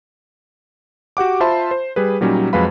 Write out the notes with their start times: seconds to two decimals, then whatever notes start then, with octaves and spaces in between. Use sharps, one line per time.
1.17 F#4 G4 F#5 D6
1.40 F4 C5 E5 A5 B5 C6
1.71 C5
1.96 G3 G#4 B4
2.21 A#2 F#3 G3 C#4 D#4
2.53 F2 F#3 G#3 B4 F5 B5